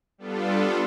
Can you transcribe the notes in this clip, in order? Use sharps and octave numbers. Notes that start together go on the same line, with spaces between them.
G3 B3 D4 F4 A4